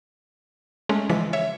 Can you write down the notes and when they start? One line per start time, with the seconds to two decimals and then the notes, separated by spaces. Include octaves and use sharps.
0.89 G#3 A3 C#4
1.09 C#3 E3 F3 G#3 B6
1.33 C#5 E5